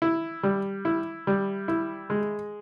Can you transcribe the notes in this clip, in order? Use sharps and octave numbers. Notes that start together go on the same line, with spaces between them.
E4
G3
E4
G3
E4
G#3